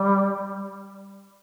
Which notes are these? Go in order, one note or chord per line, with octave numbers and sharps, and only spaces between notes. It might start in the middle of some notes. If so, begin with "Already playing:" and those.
Already playing: G3